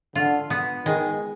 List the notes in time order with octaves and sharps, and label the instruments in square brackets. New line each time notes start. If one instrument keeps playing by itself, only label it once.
[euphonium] D3 [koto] F4
[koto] B3
[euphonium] D#3 [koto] G#3